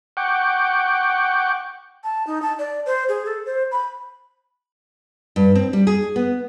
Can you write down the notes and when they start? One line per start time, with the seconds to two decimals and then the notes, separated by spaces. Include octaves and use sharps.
0.17 F#5 G5 C#6 D6
2.04 A5
2.27 D#4
2.42 A5
2.59 D5
2.86 C5
3.09 G#4
3.26 A4
3.46 C5
3.72 B5
5.36 G2
5.55 C4
5.73 G3
5.87 G#4
6.16 B3